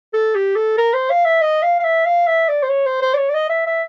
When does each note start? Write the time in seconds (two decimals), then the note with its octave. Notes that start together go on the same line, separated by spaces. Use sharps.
0.13 A4
0.35 G4
0.56 A4
0.78 A#4
0.93 C5
1.10 F5
1.25 E5
1.42 D#5
1.63 F5
1.80 F5
1.84 E5
2.05 F5
2.27 E5
2.49 D5
2.63 C5
2.69 C#5
2.86 C5
3.02 C5
3.14 D5
3.18 C#5
3.29 D5
3.34 D#5
3.50 E5
3.66 E5